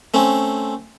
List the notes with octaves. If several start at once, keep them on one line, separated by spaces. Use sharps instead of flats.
A3 C4 C#4